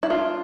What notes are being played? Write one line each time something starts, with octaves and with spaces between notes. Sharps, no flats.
E4
D4 F4